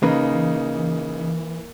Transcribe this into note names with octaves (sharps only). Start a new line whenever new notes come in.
C#3 E3 A#3 D#4 B4